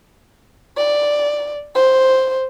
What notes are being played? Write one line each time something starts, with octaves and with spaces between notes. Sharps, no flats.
D5
C5